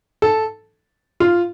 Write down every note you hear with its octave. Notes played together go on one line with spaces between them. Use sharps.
A4
F4